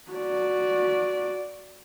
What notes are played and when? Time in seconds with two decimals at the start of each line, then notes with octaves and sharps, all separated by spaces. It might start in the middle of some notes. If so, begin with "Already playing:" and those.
0.11 F#4 D5